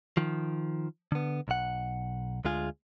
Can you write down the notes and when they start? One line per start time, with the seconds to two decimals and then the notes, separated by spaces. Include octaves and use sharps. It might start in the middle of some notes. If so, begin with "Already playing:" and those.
0.17 D#3 F3
1.12 D3 B3
1.48 B1 F#5
2.45 D2 G#3 F4 G#4